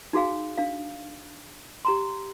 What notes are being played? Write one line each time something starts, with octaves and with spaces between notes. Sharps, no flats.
D#4 F#4 G#4 F5 G#5
D4 F5
G4 A#5 C6